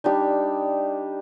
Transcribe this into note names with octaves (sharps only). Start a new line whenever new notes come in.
G3 D4 D#4